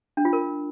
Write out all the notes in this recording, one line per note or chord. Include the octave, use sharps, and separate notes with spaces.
D4
F4
A#4